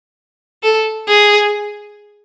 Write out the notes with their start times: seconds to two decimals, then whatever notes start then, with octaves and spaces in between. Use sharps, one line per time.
0.63 A4
1.08 G#4